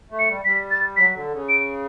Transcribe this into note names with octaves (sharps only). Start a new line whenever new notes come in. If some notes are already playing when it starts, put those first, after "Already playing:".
A3
C#7
G3
G3 B6
A6
F#3 B6
D3
C#3
D7